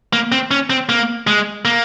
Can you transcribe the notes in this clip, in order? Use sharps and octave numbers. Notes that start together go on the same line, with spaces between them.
A#3
C4
C#4
C4
A#3
G#3
A#3